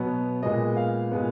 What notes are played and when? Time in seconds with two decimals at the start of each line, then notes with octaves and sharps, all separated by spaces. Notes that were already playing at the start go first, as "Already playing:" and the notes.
Already playing: B2 F#3 B3
0.42 A#2 G#3 B3 D#5
0.77 F5
1.11 A#2 G#3 B3